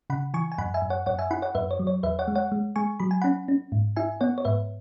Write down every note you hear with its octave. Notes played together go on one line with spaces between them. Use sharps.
C#3 F#5 B5
E3 G#5 C#6
G#5
F#2 F#5 B5
E5 G#5
F#2
C#5 F#5
F#2 C#5 F#5
E5 G#5
E4 F#5 B5
C#5 F#5
F#2 B4 E5
C#5
F#3
C#5
E2 B4 E5
C#5 F#5
G#3
C#5 F#5
G#3
G#3 G#5 C#6
F#3 B5
G#5
C#4 F#5 B5
C#4
G#2
E4 E5 G#5
B3 C#5 F#5
C#5
G#2 B4 E5